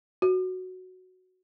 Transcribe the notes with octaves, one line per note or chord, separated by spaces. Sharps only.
F#4